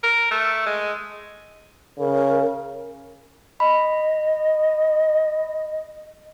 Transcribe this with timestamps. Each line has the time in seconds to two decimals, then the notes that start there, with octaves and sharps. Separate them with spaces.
0.03 A#4
0.31 A3
0.66 G#3
1.99 C#3 A#4
3.60 D#5 B5